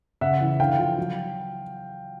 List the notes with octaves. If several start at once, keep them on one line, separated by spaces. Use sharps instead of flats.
C#3 E5 F#5
E3
D3 F5 G5
F3
F#3